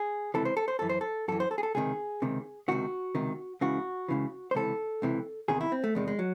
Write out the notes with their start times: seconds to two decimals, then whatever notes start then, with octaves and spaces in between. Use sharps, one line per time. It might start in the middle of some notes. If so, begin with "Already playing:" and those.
Already playing: G#4
0.34 C#2 C3 E3 A4
0.45 C5
0.57 A4
0.68 C5
0.79 F#2 E3 A4
0.89 C5
1.01 A4
1.28 F#2 E3 A4
1.40 C5
1.51 A4
1.58 G#4
1.63 A4
1.75 C#2 C3 D#3 G#4
2.22 C#2 C3 D#3
2.68 C#2 C3 D#3 F#4
3.15 C#2 C3 D#3
3.61 C#2 C#3 E3 F#4
4.09 C#2 C#3 E3
4.51 C5
4.55 C#2 C3 E3 A4
5.02 C#2 C3 E3
5.48 E2 C3 D#3 G#4
5.61 E4
5.72 C4
5.84 A3
5.95 E2 C3 D#3 G#3
6.08 G#3
6.19 F#3